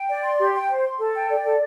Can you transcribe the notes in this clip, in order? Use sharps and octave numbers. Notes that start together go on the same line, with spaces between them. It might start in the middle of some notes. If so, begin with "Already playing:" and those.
Already playing: G5
D5
C6
G4
G5
C5
C6
A4
G5
D5
A4